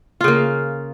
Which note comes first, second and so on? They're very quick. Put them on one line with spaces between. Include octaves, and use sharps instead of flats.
F4 C#3 A#3